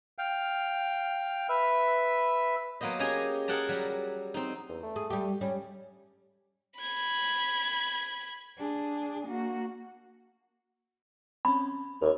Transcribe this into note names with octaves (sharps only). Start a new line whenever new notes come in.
F5 G5
B4 E5
F#3 A#3 B3 C5 D#5
C#4 G4 G#4 D#5 G#5 A#5
G#4 A#4 F#5 G5 A5 A#5
F#3 G3
C4 D#4
E2
A3
G#4
G3 G4
G3 C#4
B5 G#6
D4 G#4
A#3 F#4
C4 C#4 B5
D#2 A#4 C#5